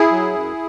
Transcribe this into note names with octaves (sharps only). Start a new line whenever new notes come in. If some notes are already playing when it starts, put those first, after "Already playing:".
Already playing: E4 G#4
F#3
F#2